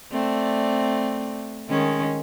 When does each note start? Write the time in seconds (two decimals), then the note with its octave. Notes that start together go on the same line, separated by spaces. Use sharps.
0.12 A3 C4 D5
1.69 D#3 G#3 C#4